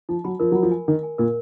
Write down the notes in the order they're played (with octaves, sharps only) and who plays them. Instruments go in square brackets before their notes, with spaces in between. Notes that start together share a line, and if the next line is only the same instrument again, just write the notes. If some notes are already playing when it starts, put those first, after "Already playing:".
[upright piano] F3 [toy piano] D#4
[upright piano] F#3 [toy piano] B5
[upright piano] F3 [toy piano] A#4
[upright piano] F#3 [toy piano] B5
[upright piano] F3
[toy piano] G#5
[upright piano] D#3 [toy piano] A#4
[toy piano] G#5
[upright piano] A#2 [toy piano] A#4